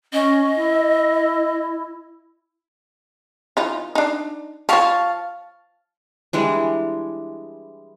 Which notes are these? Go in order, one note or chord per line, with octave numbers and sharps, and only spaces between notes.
C#4 D#5
E4
E3 D#4 F4
D4 D#4
F3 C#5 F5 A5 C#6
E3 G3 G#3 D4